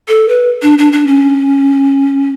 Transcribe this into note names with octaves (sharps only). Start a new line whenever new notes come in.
A4
B4
D4
D4
D4
C#4